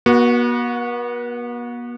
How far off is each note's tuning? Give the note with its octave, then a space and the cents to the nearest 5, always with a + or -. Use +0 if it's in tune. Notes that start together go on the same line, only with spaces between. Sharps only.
B3 -45 F#4 +0